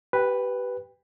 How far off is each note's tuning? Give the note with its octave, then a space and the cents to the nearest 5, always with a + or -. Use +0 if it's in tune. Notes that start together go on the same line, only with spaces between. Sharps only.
G4 -25 B4 +0 G5 +30